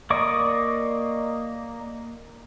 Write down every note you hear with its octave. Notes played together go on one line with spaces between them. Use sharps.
A#3 D5 D#5 C#6 D6